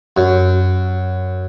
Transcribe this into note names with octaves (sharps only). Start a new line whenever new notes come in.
F#2